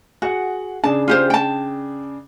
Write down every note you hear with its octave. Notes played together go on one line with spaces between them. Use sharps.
F#4 G#4 F#5
C#3 D4 G#4 A5
F4 G4 C5
G5 A5